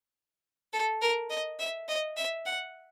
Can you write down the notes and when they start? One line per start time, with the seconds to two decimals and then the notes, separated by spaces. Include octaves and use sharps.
0.73 A4
1.02 A#4
1.30 D#5
1.59 E5
1.89 D#5
2.17 E5
2.46 F#5